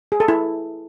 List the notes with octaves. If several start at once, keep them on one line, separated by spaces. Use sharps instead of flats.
G#4
A4
E4